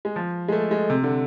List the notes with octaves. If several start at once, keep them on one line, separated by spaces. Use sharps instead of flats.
G#3
F3
G#3
A3
G#3
C3
D3